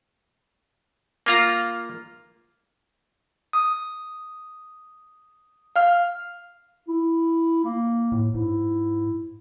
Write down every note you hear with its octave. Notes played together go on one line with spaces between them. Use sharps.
A#3 F4 A#5
D#6
F5 F6
E4
A#3
A2
G#2 E4